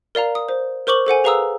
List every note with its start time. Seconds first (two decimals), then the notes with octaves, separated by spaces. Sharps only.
0.15 A#4 D5 F5 A#5
0.35 D#6
0.49 C5
0.87 A#4 C5 C#6 D6 F#7
1.07 A4 C5 F#5 G#5
1.24 G#4 B4 F5 A#5 D#6 E6